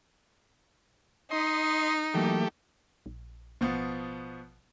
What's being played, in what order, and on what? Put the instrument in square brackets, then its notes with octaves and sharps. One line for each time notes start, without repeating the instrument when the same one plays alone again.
[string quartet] D#4 [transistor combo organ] D#5 C6
[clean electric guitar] E3 F#3 A#3 [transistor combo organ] A3 G4
[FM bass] A#1
[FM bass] A1 [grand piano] B2 F3 B3